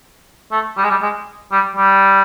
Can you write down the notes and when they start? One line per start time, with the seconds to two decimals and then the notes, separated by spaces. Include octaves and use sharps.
0.52 A3
0.78 G3
0.84 G#3
0.90 G3
1.02 G#3
1.52 G3
1.77 G3